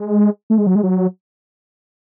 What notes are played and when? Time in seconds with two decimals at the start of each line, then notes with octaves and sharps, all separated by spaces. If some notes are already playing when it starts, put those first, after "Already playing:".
Already playing: G#3
0.50 A3
0.58 G#3
0.67 F#3
0.75 G#3
0.83 F#3